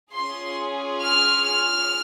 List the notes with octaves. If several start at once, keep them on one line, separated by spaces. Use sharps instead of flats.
C#4 F4 G#4 C6
F6
F6